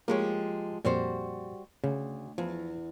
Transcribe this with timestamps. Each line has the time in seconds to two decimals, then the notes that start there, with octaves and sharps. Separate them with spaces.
0.08 F3 G#3 A#3 G4 C#5
0.85 F2 A#2 G3 F#4 C5
1.84 D2 C#3
2.38 E2 F3